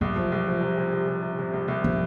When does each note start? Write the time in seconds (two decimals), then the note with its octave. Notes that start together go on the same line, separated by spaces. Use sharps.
0.01 C2 F#3
0.16 F3
0.32 C2
0.47 F3
0.61 C3
0.78 C3
0.93 C3
1.07 C3
1.22 C3
1.39 C3
1.54 C2
1.68 C2
1.84 F3